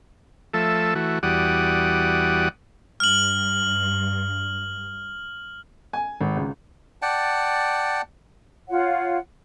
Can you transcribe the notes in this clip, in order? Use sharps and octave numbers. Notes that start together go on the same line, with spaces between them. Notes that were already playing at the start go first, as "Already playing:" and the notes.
F3 A3 A4 E5
E3 A3 F#4
E2 G3 F#4 D5 F#5 D#6
G2 F6 F#7
G#5
G#1
C#2
D5 F#5 G5 A5
F4 C#5 F#5